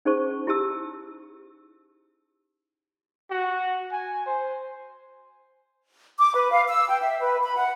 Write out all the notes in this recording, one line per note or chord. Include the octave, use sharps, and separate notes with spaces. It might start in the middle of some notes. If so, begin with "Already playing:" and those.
C#4 D#4 G#4 C5 A5 C#6
E4 G4 A5 E6
F#4
G#5
C5
D6
B4
F5
E6
G5
E5
B4
B5
F#5